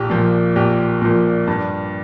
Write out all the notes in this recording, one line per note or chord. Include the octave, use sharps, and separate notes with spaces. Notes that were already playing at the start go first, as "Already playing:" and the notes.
Already playing: A#1 G4
A#2 F3
A#1 G4
A#2 F3
G2